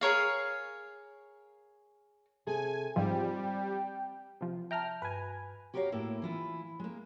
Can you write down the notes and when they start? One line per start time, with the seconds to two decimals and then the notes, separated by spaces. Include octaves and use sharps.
0.01 G#4 A#4 C#5 F5
2.47 C3 G#4 A4 G#5
2.96 G#2 F3 G3 C4 G5
4.41 C3 F3
4.71 E5 G5 A5 A#5 F6
5.02 G2 B4 G#5
5.74 F#4 G4 A#4 B4 C#5 F5
5.92 A2 A#3 E4
6.22 E3 E4 F4
6.79 G#3 A#3